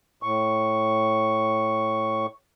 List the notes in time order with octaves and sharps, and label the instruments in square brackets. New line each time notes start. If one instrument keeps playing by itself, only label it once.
[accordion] A2 C#6